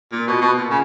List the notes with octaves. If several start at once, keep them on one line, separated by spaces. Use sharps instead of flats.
A#2
B2
B2
A#2
C#3